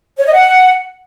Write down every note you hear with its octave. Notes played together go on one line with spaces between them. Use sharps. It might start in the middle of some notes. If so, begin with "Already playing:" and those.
C#5
D#5
F#5